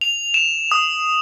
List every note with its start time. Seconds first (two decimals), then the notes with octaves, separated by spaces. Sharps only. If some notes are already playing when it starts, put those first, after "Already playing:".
0.01 F7
0.34 E7
0.71 D#6